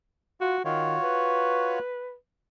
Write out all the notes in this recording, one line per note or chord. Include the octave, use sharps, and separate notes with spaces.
F4 F#4
D#3 F4 F#4 C#5
B4